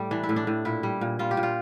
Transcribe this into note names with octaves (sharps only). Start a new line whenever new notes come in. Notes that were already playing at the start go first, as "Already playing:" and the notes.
Already playing: A2 G3 G4
E3 D4
E4
A2
D4
A2
A#2 E4
G3
A#2
G3 F4
G4
A#2
F4